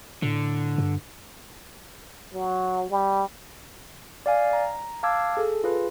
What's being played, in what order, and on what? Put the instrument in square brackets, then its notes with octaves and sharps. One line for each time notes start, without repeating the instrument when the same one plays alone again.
[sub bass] A2 [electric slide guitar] D3
[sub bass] G2
[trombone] F#3
G3
[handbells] D5 F5 G#5
A#5
F5 A5 D6 E6 G#6
G#4 A4
F4 G#4 B4